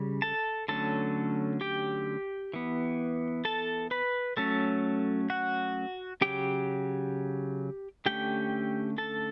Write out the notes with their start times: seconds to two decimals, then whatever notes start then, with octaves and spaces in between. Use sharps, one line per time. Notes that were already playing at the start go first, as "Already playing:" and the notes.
Already playing: C#3 G3 C#4
0.22 A4 A5
0.68 D3 F#3 A3 C#4 A4 A5
1.61 G4 G5
2.54 E3 B3
3.45 A4 A5
3.91 B4 B5
4.37 F#3 A3 C#4 A4 A5
5.30 F#4 F#5
6.21 C#3 F#3 C#4 G4 G5
8.06 D3 A3 C#4 G4 G5
8.98 A4 A5